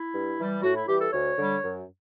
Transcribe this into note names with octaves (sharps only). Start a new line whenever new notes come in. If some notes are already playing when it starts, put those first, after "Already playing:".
Already playing: E4
G2
E3 G3
A2 F#4
E4
E3 G3 G4
A4
D2 C#5
D3 G3
F#2